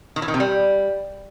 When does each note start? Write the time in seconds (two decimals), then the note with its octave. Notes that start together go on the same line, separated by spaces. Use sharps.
0.16 D#3
0.22 E3
0.28 D#3
0.34 C3
0.40 G3